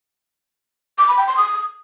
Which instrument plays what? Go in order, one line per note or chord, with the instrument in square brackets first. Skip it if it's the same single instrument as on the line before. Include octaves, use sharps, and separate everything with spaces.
[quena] D6
B5
G5
C6
D#6